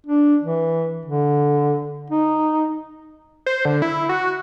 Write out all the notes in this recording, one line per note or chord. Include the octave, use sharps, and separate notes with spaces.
D4
E3
D3
D#4
C5
D3
E4
F#4